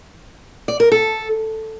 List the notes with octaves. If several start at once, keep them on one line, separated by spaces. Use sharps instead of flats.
D5
A#4
A4